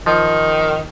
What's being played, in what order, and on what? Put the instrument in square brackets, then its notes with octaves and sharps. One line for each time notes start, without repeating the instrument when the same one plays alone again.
[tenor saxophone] D#3 [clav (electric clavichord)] F3